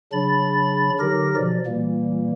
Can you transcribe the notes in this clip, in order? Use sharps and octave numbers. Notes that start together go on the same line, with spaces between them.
C#3 F#3 D4 B5 A6
D3 F#3 D#4 G4 A#4 A#6
B2 F3 D5
A#2 E3 G3 A#3